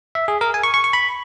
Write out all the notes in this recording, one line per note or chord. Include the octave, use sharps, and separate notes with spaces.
E5
G#4
A#4
G#5
C#6
C#6
C#6
B5